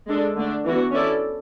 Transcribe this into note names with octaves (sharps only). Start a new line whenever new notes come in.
G#3 D4 A4
D3 A3 D4
E3 B3 D4 F#4
C#4 E4 A4 D5